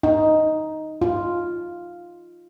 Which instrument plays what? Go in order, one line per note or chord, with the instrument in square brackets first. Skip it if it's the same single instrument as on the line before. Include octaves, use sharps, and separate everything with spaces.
[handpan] D#4
F4